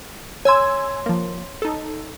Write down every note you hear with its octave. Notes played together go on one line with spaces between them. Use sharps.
C#5 G#5 C6 E6 G#6
F3 A#3
D#4 A4